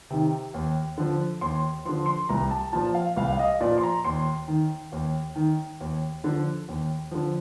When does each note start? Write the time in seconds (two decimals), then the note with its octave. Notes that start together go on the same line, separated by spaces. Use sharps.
0.10 C3 D#3
0.54 D#2
0.97 D3 F3
1.41 D#2 C6
1.85 D3 F3 C6
2.06 C6
2.29 C2 A#5
2.51 A5
2.73 A#2 F3 A5
2.95 F5
3.17 C2 F5
3.33 F5
3.39 D#5
3.60 A#2 D5
3.64 F3
3.78 C6
3.83 A#5
4.04 D#2 C6
4.48 D#3
4.92 D#2
5.36 D#3
5.80 D#2
6.24 D3 F3
6.68 D#2
7.11 D3 F3